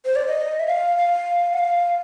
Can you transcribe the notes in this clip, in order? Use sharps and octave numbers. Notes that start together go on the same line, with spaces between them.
C5
D5
D#5
E5
F5
F5
F#5
F5